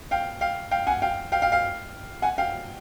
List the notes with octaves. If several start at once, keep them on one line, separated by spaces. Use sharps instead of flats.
F5 G5
F5 G5
F5 G5
F#5 G#5
F5 G5
F5 G5
F5 G5
F5 G5
F#5 G#5
F5 G5